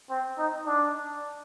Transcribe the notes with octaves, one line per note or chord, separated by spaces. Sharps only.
C4
D#4
D4